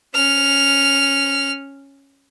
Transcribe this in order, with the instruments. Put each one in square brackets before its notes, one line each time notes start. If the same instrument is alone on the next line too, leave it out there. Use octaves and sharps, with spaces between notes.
[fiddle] C#4 F6